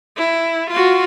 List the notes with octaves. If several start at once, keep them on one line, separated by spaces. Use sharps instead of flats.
E4
F4 F#4